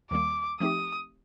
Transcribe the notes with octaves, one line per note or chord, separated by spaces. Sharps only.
D#2 D#3 G3 A#3 D6
F3 A3 C4 D#4 G4 D#6